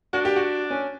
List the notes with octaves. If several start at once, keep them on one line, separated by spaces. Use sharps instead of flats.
D4 F#4
G4
F#4
C#4